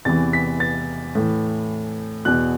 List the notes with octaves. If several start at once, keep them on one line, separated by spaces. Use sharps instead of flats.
E2 C3 E3 A6
B6
A6
A2 E3
E2 B2 F#6